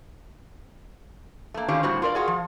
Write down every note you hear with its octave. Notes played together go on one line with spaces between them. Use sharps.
A3 A#3
D3 D#3 C#4 F4 G4
A2 G3 C4 F#4
F4 A#4 D5
F4 F#4 G#4
F3